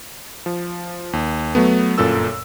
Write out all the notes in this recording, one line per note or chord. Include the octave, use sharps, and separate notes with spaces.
F3
D#2
F#3 A3 B3
G1 F#2 A#2 A4 E6